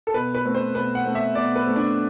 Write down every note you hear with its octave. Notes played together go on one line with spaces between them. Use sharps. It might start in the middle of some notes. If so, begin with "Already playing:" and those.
A4
B2 B4
B4
A3 C4
C5
B2 B4
F#5
A3 C4
E5
B2 D5
B4
A3 C4
D4